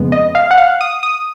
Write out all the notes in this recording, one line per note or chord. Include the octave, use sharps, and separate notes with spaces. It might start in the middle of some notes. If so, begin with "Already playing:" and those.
Already playing: F2 C#3 G#3 B3
D#5
F5
F#5
F5
D#6
D#6